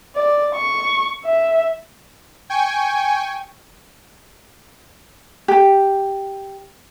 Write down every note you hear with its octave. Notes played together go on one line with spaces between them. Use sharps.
D5
C#6
E5
G5 G#5 C#6
G4